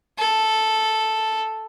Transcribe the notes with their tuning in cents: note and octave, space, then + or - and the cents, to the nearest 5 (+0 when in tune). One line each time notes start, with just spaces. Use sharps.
A4 -5